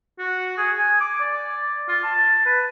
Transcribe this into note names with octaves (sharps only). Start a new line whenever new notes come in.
F#4
G#4
G#5
D6
D5
F4
A5
B4